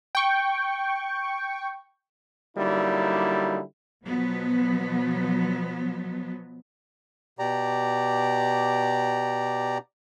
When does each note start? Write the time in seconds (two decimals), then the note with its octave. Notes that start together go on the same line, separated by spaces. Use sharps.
0.15 G5 C#6
2.57 D3 F#3 G3 A#3 D#4 E4
4.04 B2 F3 F#3 B3
7.39 B2 G4 D5 A#5